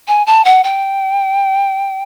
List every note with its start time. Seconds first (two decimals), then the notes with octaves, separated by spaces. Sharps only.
0.08 G#5
0.26 A5
0.45 F#5
0.64 G5